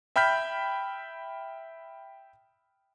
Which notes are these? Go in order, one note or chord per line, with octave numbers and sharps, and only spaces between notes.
E5 G5 B5 F6 G6 B6